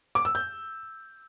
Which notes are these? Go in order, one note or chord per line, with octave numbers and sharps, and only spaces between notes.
D6
E6
G6